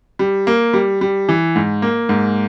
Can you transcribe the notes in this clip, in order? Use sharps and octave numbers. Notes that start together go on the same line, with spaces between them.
G3
A#3
G3
G3
E3
G#2
A#3
G#2